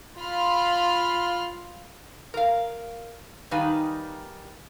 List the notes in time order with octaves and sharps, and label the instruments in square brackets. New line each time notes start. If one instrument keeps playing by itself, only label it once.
[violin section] F4 B5 C6 F6
[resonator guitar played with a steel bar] A#4 F5
D#3 G3 D#4 B4 F5 G#5